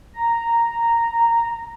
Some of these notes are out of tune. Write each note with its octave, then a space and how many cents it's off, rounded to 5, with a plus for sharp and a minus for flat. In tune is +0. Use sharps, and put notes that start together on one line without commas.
A#5 -5